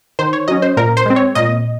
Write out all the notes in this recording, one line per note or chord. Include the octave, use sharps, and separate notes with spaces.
D#3 C5
C#5
F#3 C#4 D#5
C5
A#2 A#4
C5
G#3 C4
C#5
A#2 D#5